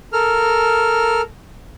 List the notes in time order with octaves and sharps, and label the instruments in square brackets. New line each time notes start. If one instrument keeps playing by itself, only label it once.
[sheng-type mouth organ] A4 A#4 F6